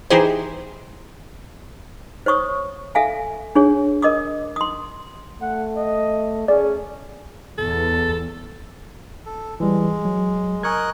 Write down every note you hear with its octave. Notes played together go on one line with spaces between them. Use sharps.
E3 D#4 E4 G4 G#4 C5
C5 C#5 C#6 D#6
A4 E5 F5 G#5
D4 G#4 C#5
A#4 D#5 D6 D#6
C6 D#6
A3 F#5
D#5
C#4 G#4 D5
E2 A4
A4
E3 G3 G#3
F#3
A#4 D#5 G#5 C#6 F#6 G#6